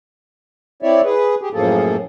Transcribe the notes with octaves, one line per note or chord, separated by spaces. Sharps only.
C4 E4 C#5 D5 E5
G#4 B4
G4 G#4
F#2 A2 F3 A#3 G#4 A4